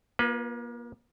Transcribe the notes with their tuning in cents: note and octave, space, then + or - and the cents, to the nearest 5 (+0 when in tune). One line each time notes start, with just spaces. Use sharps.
A#3 +35 F4 +0 B4 +0